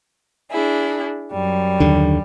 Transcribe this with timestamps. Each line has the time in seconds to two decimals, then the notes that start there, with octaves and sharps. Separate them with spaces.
0.52 D4 E4 G#4
1.32 F#2 G3
1.80 D#2 D3